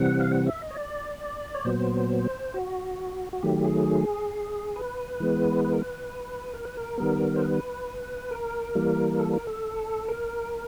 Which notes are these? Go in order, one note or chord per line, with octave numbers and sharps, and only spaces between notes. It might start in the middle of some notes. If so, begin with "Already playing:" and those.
Already playing: C3 E3 G3 C4 F#5
F5
F#5
E5
D#5
C#5
D5
C#5
A#2 F#3 B3 C5
F#4
F#4
D#3 F#3 A3 G4
G#4
B4
E3 G#3 B3
B4
A#4
B4
A#4
B4
A#4
D#3 G3 B3
C5
B4
A#4
E3 G3 A#3
A4
A#4
A4
A#4